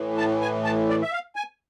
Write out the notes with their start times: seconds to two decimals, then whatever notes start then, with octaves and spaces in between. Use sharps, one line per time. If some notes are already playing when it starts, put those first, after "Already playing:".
Already playing: A2 E3
0.17 A5
0.41 G#5
0.64 A5
0.89 D5
1.02 E5
1.12 F5
1.36 G#5